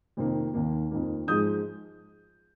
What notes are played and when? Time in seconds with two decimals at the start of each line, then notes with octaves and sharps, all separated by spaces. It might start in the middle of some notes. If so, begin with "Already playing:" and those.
0.17 F2 C3 D#3 A#3
0.54 D#2 D#3 A#3
0.91 F2 D#3 A#3
1.27 G#2 F3 G#3 D#6 G6